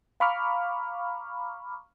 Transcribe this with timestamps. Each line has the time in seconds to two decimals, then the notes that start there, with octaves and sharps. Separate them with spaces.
0.20 F5 A#5 B5 C#6 D6 F6